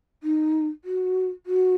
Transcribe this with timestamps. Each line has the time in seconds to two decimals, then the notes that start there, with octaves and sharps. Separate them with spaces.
0.23 D#4
0.84 F#4
1.46 F#4